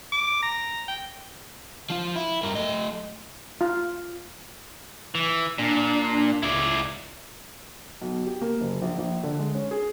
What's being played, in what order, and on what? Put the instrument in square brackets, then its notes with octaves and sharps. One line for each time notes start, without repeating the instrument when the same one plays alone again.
[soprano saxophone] D6
A#5
G5
[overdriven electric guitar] F3 F4
E4
G2 A#4
A3 D#5
[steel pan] F4
[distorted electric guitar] E3
[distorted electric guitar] A#2 [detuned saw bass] D4
[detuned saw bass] C#2 [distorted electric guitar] E4 D5
[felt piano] B1
G4
A#3
F#1
A#1
A#1
D3
G#3
C#4
G#4